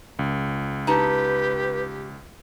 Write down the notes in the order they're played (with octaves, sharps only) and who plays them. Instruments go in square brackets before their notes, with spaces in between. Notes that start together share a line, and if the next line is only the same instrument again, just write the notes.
[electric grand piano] C#2
[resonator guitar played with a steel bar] D#4 A5 [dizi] G4 [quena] B4